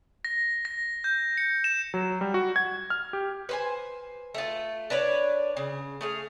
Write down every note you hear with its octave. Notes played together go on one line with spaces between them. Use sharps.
A#6
A#6
G6
C#7
E7
F#3
G3
F#4
G#6
F6
G4
B4 C5 G#5
A3 F4
D4 B4 C#5 D5
C#3
A3 G#4 F5